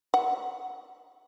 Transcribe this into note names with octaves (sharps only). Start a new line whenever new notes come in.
F#5